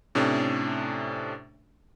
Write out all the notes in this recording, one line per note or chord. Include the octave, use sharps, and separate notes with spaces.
A2 C3 A3 C#4 D4